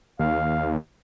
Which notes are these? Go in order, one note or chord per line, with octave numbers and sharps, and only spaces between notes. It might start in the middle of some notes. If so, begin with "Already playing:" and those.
D#2 F5